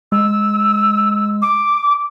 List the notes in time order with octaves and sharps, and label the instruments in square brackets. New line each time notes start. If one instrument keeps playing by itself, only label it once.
[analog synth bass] G#3 [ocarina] E6
[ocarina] D6